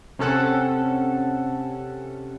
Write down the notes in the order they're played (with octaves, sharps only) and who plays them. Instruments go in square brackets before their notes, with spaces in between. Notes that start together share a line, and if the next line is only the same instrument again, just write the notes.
[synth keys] C3 C#4 A4 F#5